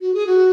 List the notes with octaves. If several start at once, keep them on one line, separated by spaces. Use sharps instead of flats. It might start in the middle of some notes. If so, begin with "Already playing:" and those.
F#4
G#4
F#4